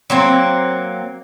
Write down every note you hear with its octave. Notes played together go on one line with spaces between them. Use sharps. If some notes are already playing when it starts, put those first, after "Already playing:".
F#3 A#3 C4